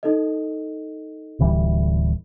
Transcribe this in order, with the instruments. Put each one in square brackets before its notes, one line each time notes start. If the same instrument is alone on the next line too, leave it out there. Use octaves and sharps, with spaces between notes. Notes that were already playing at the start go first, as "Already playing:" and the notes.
[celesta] D#4 A4 D#5
[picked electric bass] D1 E3 G3